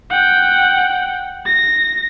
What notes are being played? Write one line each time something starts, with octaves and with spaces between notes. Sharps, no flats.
F#5 G5
A#6